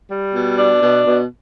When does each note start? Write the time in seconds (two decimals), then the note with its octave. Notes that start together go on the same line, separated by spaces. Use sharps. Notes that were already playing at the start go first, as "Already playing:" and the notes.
0.11 G3
0.35 B2
0.58 D4
0.82 B2
1.06 B2